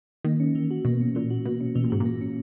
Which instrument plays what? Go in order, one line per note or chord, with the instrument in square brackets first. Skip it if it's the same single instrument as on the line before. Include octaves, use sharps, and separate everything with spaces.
[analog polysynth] D#3 [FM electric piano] A#3
[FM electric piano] C#4
E3
F#4
[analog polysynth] B2 [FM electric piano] A#3
[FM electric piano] C#4
[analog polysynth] A#2 [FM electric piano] E3
[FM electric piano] F#4
[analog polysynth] B2 [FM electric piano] A#3
[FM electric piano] C#4
[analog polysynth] B2 [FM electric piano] E3
[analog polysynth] A#2
[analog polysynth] G#2 [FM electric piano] F#4
[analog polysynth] A#2
[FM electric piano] A#3
C#4